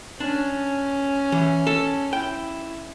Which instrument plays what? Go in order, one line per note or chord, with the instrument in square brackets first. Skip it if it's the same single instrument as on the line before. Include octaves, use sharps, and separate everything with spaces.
[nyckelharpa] C#4 [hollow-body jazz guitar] D4
[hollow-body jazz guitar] E3
A4
[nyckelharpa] E4 [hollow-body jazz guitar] G5